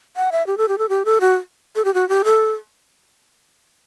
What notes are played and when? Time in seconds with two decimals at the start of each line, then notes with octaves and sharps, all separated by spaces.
0.16 F#5
0.32 E5
0.47 G4
0.58 A4
0.68 G4
0.78 A4
0.89 G4
1.05 A4
1.21 F#4
1.76 A4
1.85 G4
1.94 F#4
2.09 G4
2.24 A4